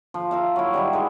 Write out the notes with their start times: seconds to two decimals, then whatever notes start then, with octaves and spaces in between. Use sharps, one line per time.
0.14 F3
0.31 A#4 E5 F5
0.56 F#3 E4
0.74 G3 D#4 E4
0.93 E3 G#3